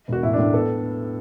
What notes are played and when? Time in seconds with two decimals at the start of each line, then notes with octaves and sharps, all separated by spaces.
0.08 E1 F#4
0.23 A1 E4
0.33 A2 D4
0.53 B3 A4